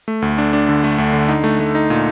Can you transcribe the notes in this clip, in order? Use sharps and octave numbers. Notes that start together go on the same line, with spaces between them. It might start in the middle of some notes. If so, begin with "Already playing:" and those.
A3
D2
D4
D4
D3
A3
D2
D3
D#4
A3
A3
D#4
A#2